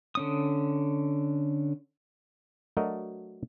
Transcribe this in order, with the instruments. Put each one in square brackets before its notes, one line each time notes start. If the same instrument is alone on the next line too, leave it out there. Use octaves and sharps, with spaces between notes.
[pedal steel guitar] D3 C#4 D#6
[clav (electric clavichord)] F#3 A3 D4 F#4 A#4 D#5